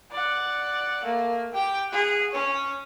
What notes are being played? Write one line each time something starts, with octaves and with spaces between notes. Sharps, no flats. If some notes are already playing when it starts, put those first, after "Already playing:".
D5 F#5
A3 A#3
G4 G5
G#4 F#5
C#4 C#5